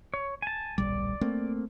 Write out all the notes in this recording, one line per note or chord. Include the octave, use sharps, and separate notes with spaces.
C#5
G#5 A5
D1 A#1 G3 D5
A3 A#3 C4